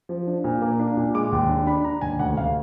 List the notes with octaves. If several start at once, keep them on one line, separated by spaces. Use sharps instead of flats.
F3
D4
A#2
A#3
D4
A#2
G#3 D6
D#2
D4
D4 B5
D4 A#5
D#2 G#5
D2 F#5
D2 F5